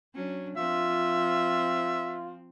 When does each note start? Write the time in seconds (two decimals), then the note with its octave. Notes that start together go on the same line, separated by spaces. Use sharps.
0.14 F#3 C#4 D4
0.57 F3 C4 F4 E5